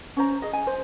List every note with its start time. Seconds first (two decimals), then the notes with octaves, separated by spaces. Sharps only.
0.17 C#4 C5 A#5
0.42 G#4 D#5
0.53 G#5
0.67 C5